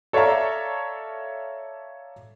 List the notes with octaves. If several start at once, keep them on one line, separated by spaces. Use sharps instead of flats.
A4 C#5 D5 E5 F5 A#5